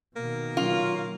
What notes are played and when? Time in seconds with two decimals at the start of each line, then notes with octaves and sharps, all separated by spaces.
0.16 B2 D#3 A#3
0.57 F#3 F4